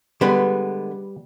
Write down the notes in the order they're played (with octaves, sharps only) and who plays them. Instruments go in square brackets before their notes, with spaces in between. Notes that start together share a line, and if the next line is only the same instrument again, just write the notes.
[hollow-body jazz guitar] D3 G#3 B3 [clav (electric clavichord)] G3 B4